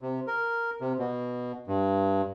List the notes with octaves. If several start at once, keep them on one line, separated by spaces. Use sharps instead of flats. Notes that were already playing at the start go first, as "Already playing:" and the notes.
C3
A#4
C3
B2
G2